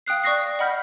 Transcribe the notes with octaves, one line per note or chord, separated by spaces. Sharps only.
F5 G5 D#6 F#6 C7
D5 C#6 D#6 A#6 C7
D#5 F#5 B5 F6 G6 B6